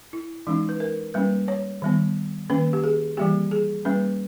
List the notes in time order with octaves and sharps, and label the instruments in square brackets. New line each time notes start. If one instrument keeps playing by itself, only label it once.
[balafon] E4
E3 G#3 C#4 D#4
B4
A#4
G3 A#3 C#4 B4
C#5
D#3 G3 B3
D#3 A#3 C#4 B4
G4
G#4
E3 G3 A#3 G4
G#4
G3 A#3 C#4 B4